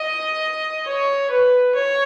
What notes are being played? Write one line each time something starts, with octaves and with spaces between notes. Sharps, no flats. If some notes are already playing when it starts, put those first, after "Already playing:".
Already playing: D#5
C#5
B4
C#5